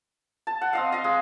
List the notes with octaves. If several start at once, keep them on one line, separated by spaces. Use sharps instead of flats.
A5
F#5
C4 D#5 F5
D#5 F5
G#3